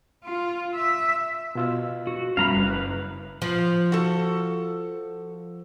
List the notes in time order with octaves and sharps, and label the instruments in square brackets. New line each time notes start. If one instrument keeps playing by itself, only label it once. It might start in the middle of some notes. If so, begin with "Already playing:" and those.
[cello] F4
E5
[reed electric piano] B2 F4 E6
[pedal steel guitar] F#4
[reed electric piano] F#2 [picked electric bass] G3 C#4 [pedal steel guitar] F5 A#5 B5
[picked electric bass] F#1 [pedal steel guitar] B4
[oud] F3
[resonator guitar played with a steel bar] F#4 A4